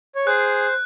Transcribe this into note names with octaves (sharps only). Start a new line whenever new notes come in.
C#5
G#4 C5 F#6